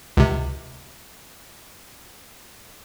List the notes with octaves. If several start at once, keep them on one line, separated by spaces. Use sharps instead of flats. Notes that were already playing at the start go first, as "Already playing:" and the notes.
C#2 C3